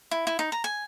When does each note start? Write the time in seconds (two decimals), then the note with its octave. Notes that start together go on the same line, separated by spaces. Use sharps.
0.11 E4
0.27 E4
0.39 D#4
0.52 A#5
0.64 G#5